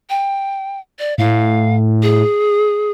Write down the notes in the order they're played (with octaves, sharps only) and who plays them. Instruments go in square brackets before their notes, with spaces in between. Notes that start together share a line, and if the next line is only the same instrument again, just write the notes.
[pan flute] G5
D5
[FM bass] A2 [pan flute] F5
[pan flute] G#4